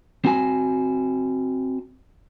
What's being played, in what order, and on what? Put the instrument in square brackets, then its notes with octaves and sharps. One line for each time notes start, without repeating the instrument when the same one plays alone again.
[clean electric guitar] C4 F#4 G#5